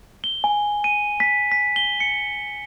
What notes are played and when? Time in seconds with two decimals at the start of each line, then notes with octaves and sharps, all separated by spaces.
0.24 G7
0.44 G#5
0.84 D#7
1.20 B6
1.52 B6
1.76 G7
2.00 C#7